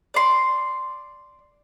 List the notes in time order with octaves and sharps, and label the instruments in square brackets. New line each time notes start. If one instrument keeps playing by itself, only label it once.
[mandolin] D5 C6